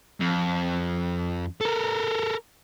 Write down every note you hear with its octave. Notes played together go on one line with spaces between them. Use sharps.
F2
A4 A#4